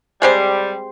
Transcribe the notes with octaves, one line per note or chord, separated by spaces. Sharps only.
G3 G#3 C4 G4 C5